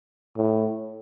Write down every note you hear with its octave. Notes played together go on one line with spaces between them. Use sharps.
A2